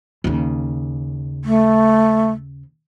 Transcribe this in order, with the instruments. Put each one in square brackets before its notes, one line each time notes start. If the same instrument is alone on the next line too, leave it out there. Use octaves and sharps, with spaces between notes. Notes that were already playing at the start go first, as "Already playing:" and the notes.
[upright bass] D#2 C#3
[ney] A3